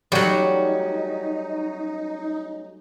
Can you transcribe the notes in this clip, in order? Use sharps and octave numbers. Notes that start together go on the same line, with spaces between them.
F#3 G3 A3 C#4 D#4 F#4